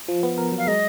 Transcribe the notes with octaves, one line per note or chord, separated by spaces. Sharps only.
F3
B3
A#4
F#3
F5
G#3 D#5